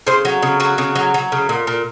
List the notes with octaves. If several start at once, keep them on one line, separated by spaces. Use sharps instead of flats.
C#3 C5
F#3
C#3
F#3 F#4
C#3
F#3
F#3
C#3
A#2
A#2